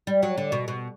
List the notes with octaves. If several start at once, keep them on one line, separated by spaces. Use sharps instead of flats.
G3
F#3
D3
B2
B2